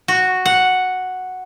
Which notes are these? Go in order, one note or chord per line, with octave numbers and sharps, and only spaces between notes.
F#4
F#5